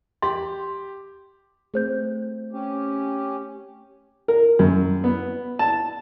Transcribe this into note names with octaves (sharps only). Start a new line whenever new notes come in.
G4 C6
A3 C4 G#4 C5 G6
C#4 G4
A#4
F#2
B3
A5